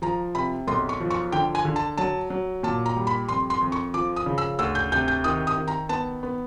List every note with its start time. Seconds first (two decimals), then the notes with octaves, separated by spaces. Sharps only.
0.02 F3 A#5
0.35 C3 B5
0.67 B1 C6
0.89 C#6
1.00 F3
1.10 C#6
1.32 D3 G5
1.55 G#5
1.65 D3
1.76 A5
1.98 F#3 A5
2.30 F#3
2.63 A#2 A5
2.86 A#5
2.96 G3
3.07 B5
3.29 F2 C6
3.50 C6
3.61 F2
3.72 C#6
3.94 F3 D6
4.16 D#6
4.26 C#3
4.38 E6
4.59 D2 E6
4.75 G6
4.92 C3 G6
5.08 G6
5.24 D#3 D#6
5.47 D#6
5.57 D#3
5.68 A#5
5.89 B3 A5
6.23 B3